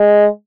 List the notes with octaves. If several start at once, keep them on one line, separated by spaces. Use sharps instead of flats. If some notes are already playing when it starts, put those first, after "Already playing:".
Already playing: G#3